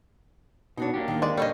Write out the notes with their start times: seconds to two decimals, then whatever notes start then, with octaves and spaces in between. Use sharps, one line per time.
0.77 B2 D4 D#4 F#4 C#5
0.94 A#3 D4 G4
1.08 D#2 D#3
1.22 G#3 D5
1.37 C#3 G3 A4 C#5 D#5